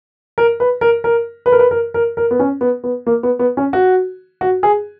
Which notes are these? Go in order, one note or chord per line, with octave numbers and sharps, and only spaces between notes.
A#4
B4
A#4
A#4
B4
A#4
B4
A#4
A#4
A#4
B3
C#4
B3
B3
A#3
B3
B3
C#4
F#4
F#4
G#4